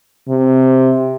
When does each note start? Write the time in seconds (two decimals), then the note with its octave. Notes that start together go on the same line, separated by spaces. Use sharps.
0.28 C3